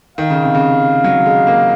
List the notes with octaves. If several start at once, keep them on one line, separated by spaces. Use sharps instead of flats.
D#3 F5
C#3
C3
C#3
F#3
G#3
A#3